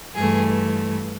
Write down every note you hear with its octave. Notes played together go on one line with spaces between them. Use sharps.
G2 E3 A3 G#4